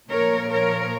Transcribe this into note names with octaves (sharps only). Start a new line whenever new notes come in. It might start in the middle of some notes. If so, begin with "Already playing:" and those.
A#2 F3 A#4 C#5
A#4 C#5